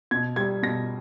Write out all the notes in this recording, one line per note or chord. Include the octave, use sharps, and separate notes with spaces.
B2 G#6
G3 G#6
B2 A#6